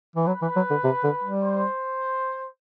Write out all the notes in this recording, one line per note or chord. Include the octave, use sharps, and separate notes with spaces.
E3
F#3 B4
E3
F#3
D3
C3
D3
G3
C5